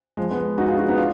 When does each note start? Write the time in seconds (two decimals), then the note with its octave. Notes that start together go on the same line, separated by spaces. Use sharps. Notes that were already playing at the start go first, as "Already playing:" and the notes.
0.17 F3 G#3
0.30 G#3 B3
0.58 D#4 F#4
0.68 F4 G#4
0.78 D#4 F#4
0.88 B3 D#4
0.98 D4 F4